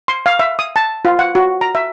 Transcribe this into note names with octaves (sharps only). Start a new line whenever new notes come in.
C6
F5
E5
D#6
A5
F4
F#5
F#4
A#5
E5